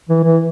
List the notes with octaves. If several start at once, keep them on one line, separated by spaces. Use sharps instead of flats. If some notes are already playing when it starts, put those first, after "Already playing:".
E3
E3